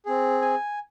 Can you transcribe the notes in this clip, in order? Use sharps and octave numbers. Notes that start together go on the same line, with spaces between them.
C4 G#4
G#5